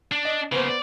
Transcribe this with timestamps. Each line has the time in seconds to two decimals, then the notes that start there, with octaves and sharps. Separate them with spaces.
0.12 D4
0.25 D#5
0.52 C#3 A#3 B3 C5
0.69 D5